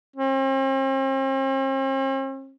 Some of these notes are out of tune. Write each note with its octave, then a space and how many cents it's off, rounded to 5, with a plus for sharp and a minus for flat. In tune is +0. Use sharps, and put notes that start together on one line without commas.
C4 +45